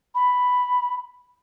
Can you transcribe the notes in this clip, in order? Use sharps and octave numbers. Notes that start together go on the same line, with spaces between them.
B5